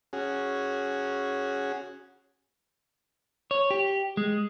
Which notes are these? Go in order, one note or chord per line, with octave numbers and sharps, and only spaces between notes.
C#4 F#4 G#4
C#5
G4
G#3